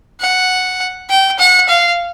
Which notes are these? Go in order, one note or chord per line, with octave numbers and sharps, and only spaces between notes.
F#5
G5
F#5
F5